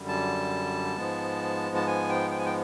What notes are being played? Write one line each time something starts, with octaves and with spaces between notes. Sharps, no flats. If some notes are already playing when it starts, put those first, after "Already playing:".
Already playing: F#2 D3 G3
A5
G#2 F3 G#3 B3
A5
G#5
G5
G5
G#5
G5